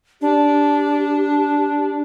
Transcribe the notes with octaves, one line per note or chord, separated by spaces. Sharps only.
D4 G4